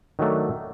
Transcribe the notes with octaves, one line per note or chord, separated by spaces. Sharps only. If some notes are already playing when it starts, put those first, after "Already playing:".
D#3 F#3 A3 D4 F#4